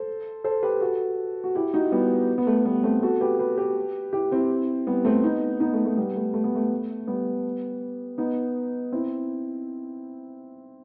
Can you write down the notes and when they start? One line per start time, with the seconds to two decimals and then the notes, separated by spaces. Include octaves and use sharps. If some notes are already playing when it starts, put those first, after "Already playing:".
Already playing: A4 C5
0.44 A4 C5
0.63 G4 B4
0.81 F#4 A4
1.44 F#4
1.55 E4 G4
1.73 D#4 F#4
1.92 G3 B3
2.38 B3
2.47 A3
2.65 G3 B3
2.84 A3 C4
3.03 F#4 A4
3.21 G4 B4
3.39 G4 B4
3.58 G4 B4
4.13 E4 G4
4.31 C4 E4
4.87 G3 B3
5.05 A3 C4
5.24 B3 D#4
5.60 B3 D#4
5.73 A3
5.85 A3
5.97 G3 B3
6.16 A3
6.34 A3
6.44 B3
6.55 A3
7.07 G3 B3
8.18 B3 D#4
8.92 C4 E4